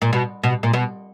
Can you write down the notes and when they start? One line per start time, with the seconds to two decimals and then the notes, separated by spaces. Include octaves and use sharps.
0.02 A#2
0.13 B2
0.43 B2
0.63 A#2
0.73 B2